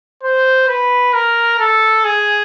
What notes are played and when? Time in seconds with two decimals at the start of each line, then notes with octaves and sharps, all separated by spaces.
0.23 C5
0.68 B4
1.14 A#4
1.60 A4
2.05 G#4